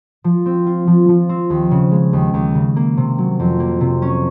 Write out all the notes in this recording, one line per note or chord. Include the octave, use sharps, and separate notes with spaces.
F3
C4
F4
F3
F3
C4
D#2
C#3
G#3
D#2
D#2
C#3
A#3
C3
F#3
F2
A#3
C3
C#4